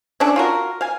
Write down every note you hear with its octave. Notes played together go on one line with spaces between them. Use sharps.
C#4 D4 A4
F4 F#4 A#4
F5 G#5